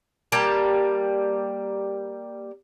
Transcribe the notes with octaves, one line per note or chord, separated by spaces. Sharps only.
G3 A#3 A5